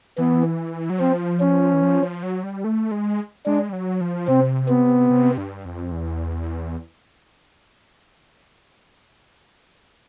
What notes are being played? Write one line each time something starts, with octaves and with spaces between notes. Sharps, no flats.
E3 B3
F#3
F3 C4
C#4
E3
F3
F3
F#3
G3
A3
G#3
G#3 D4
G3
F#3
F3
C3 C4
B3
C3
G2
F2
E2